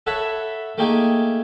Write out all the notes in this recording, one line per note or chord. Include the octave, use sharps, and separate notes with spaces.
A4 C#5 E5 F#5 B5
A3 A#3 D#4 G4 G#4 G#5